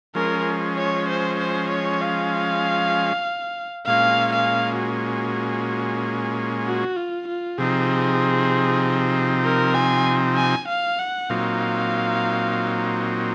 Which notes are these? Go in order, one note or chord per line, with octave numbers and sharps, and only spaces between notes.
F3 G#3 C#4 A#4
C#5
C5
C5
C#5
F5
A#2 G#3 C#4 F5
F5
F#4
F#4
F4
F4
C3 F3 C4 D#4 G#4
A#4
G#5
G#5
F5
F#5
A#2 F#3 C4 D#4 F5